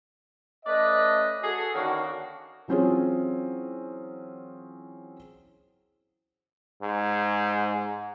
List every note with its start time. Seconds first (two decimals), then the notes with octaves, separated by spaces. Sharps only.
0.66 A3 C#4 B4 D5 D#5
1.42 F#4 G#4 A4
1.75 D3 D#3 A#3 C#4 D4 F#4
2.68 E3 F#3 C4 C#4 F4 G#4
6.83 G#2